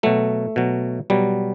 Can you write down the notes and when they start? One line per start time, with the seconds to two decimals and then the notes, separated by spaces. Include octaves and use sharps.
0.03 B2 F#3 A3
0.56 B2 F#3
1.10 B2 F#3 G3